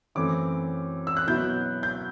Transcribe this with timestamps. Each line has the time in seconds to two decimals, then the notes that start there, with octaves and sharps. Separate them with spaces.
0.15 F#2 E3 A3 C4 D6
1.07 E6
1.17 F#6
1.27 B2 F#3 B3 E4 G6
1.83 G6